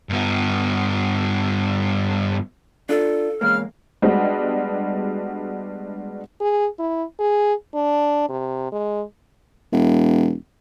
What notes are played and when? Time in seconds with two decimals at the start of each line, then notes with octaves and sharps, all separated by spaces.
0.09 G2 B3
2.89 D4 F4 A4
3.41 E2 C#3 G#3 A#3 F5 F6
4.02 G3 G#3 B3 D4 F#4 D#5
6.41 G#4
6.79 E4
7.19 G#4
7.74 D4
8.29 C3
8.72 G#3
9.72 E1